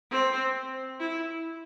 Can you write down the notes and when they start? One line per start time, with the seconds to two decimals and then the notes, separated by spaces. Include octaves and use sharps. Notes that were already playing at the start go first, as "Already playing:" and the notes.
0.12 C4
1.00 E4